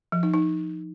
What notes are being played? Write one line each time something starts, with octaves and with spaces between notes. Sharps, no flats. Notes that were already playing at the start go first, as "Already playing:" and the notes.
F3
D#4
D#4